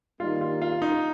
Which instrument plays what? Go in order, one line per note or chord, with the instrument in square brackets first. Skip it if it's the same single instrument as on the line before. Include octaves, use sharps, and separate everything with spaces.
[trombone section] D#3 G3 A#3 D#4 [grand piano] F4
[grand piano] F4
F4
D#4